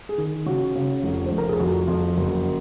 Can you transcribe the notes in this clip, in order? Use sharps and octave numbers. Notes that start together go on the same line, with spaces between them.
G#4
D#3
C#3 F#4
C#3
F1
F1 C5
A#4
G#4
F2 F#4
F2
F#1